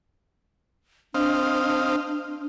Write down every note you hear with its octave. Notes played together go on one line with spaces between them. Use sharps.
C4 D4 D#5 F5